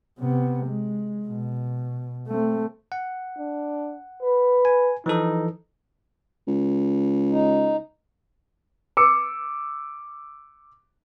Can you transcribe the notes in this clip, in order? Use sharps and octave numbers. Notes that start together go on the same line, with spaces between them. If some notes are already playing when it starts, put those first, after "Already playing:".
C3 B3
G#3
B2
A3 C4
F#5
D4
B4
G#5
E3 F3 D#4 A4
C#2
D#4
D6 E6 C#7